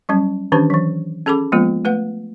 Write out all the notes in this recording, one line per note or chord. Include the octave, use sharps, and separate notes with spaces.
F#3 G3 C#4
D#3 E3 C#4 D4 G4 B4
E3 F#3
C#4 G#4 A4 B5 D6
F3 G#3 A#3 B3 F4
A3 B4 F#5